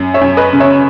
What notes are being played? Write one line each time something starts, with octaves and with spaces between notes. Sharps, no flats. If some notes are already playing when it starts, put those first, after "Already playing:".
Already playing: F#2
C#5 E5
F#2
B4 D#5
C#3
C#5 E5